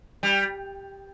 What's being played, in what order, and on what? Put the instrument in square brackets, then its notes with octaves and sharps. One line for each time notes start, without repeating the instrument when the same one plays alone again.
[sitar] G3